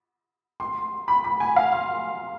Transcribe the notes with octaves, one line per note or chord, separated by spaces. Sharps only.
C6
B5
B5
G#5
F5
C6